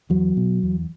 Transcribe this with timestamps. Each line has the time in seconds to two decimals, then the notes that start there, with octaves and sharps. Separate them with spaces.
0.10 E2 F#3
0.37 B2
0.63 E2